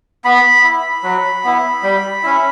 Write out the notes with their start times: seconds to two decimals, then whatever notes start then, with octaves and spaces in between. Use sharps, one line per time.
0.25 B3 B5
0.64 E4
1.03 F#3
1.44 B3 E4
1.83 G3
2.23 C#4 E4